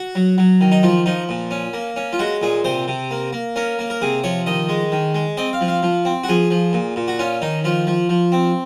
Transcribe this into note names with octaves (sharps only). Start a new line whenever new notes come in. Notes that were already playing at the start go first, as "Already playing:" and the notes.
Already playing: F#4
F#3
F#3
D#3
D#4
F3 F4
F3 D#4
A#2
C#4
A#3
C#4
F4
G#3 F#4
A#2 G#4
C3 C5
C3
A#3
A#3
C#4 A#4
A#3
A#4
C3 G#4
F3 C#5
D#3 D#5
G#3
D#3
G#3
C4 D#5
F5
F3
F5
F3
C4
F#4
F3 G#4
F3
A#2
A#2
F#4
C#4 F4
D#3 D#4
F3 F4
F3
F3
C4